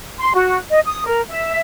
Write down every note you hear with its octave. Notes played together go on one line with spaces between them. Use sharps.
C6
F#4
D#5
D#6
A#4
E5